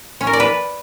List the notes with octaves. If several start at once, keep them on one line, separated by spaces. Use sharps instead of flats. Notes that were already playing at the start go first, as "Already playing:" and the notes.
C#4
A#4
D5
B4